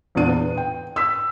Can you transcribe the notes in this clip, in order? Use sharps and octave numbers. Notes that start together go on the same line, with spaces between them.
E2 A#2 B3 D4 D#7
B4
G5
E6 B6